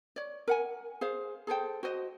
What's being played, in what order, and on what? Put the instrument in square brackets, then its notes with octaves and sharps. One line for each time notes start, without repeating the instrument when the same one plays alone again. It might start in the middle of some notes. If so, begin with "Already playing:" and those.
[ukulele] C#5 D5
A#4 F#5 G#5
G#4 C5 F5
G#4 A4 C5 G5
F#4 C5 D#5